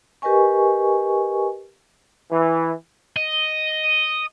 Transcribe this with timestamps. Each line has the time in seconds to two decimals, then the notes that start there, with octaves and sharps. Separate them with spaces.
0.22 G4 A#4 B4 D#5 G#5 C#6
2.30 E3
3.16 D#5